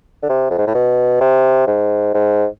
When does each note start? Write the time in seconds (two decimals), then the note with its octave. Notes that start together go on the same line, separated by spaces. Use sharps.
0.23 D3
0.29 C3
0.50 F2
0.58 G#2
0.67 A2
0.74 B2
1.21 C3
1.67 G#2
2.14 G#2